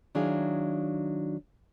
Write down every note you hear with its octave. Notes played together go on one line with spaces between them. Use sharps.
D#3 F#3 D4 E4 G#4 F5